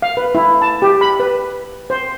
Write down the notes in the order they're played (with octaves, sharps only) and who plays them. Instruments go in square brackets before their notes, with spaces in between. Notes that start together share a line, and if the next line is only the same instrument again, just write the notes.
[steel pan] F5
B4
E4
A5
G4
B5
B4
C5